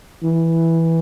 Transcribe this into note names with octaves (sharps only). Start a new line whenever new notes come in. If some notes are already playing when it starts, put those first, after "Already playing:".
E3